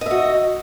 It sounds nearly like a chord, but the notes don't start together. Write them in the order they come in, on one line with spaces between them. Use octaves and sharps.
D#5 E5 F#4